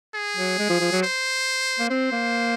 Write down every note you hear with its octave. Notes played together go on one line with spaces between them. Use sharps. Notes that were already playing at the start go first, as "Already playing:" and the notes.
G#4
F#3
G#3
F3
F3
F#3
C5
A#3
C4 C5
A#3